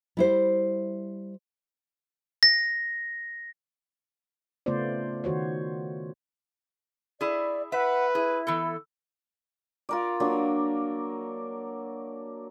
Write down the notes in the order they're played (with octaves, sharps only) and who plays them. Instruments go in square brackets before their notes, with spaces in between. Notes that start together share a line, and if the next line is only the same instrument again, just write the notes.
[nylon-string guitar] G3 E4 C5
[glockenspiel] A#6
[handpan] C#3 A3 B3 F4 C5 D5
D#3 F#4 C5 C#5
[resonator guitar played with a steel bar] E4 G#4 [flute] D5
[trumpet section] B4 [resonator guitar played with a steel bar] E5 [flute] F#5
[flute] E4 [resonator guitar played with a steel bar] G#4
[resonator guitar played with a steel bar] E3 B3 A4
[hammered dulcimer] F4 A#4 D5
F#3 A#3 D4